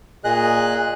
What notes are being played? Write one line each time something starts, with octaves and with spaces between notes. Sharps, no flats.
A#2 G#4 D#5 F#6